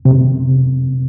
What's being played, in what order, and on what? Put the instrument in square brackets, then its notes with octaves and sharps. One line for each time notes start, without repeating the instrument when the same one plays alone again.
[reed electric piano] C3